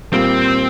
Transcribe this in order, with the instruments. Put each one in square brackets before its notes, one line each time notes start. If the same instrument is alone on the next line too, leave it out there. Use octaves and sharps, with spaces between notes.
[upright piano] A#2 G3 A#3 [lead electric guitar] C4